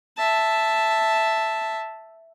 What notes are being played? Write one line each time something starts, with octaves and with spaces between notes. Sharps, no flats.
E5 A5